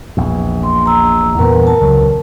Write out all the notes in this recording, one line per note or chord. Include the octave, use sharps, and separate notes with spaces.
A#1 E2
C6
A#5 E6
E2 G2 A#2 A#4 B4
A#4 A5
C#2 F#3